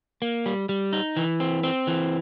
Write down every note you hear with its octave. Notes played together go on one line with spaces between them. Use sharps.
A#3
G3
G3
D#4
E3
C4
C4
E3